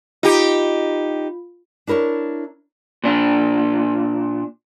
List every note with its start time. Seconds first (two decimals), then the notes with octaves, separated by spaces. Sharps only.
0.23 D#4 F4 G4
1.87 D4 E4 A#4 B4 C#5
3.04 A#2 D4